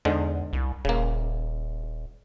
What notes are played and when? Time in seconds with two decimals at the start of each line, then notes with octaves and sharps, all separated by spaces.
0.05 E2 G#2 D3 G#3
0.53 C2
0.85 D#1 C#3 A#3